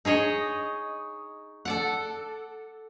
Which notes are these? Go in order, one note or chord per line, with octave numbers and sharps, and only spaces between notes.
D#4 G#4 C#5 D#5
A4 D5 F#5